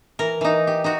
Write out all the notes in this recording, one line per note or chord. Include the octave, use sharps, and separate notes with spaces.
E3 A#4
E3 D#4
G4
D#4 F#4